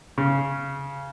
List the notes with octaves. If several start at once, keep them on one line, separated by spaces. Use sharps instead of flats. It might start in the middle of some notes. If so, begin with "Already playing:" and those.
C#3